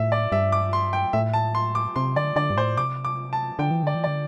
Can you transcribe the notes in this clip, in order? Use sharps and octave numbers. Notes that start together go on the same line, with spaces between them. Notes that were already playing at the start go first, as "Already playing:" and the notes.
Already playing: A2 E5
D5
G2 E5
D6
C6
G5
A2 E5
A5
C6
D6
C3 C6
D3 D5
D3 D5
G2
A2 C5
C3 D6
D6
A5
D3 G5
E3
D3 D5
E3
D3 D5